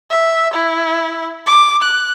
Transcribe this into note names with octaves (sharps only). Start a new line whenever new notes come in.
E5
E4
D6
F#6